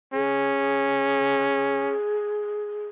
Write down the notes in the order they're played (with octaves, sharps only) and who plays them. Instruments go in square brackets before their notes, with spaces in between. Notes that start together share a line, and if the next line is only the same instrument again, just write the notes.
[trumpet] C#4 [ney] G#4